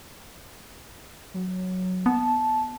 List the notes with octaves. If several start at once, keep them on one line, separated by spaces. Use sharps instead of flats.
F#3
B3 A5